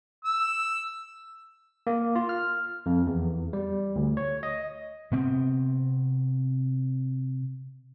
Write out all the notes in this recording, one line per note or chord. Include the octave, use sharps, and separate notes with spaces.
E6
A#3
F4
F6
F2
E2
G3
D2
C#5
D#5
C3 B3 C4